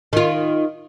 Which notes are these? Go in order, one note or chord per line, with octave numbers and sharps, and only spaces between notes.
D#3 F4